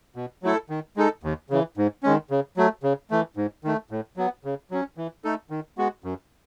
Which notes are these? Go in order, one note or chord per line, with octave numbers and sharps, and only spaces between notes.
B2
F#3 A3 E4 A4
D#3
G#3 D#4 A4
D#2
C#3 E3
G#2
D#3 G#3 C#4
C#3
F#3 A3
C#3
E3 A3
G#2
D#3 A3
A2
F#3 B3
C#3
F#3 C#4
E3
A3 D#4 A4
D#3
G#3 B3 F#4
F#2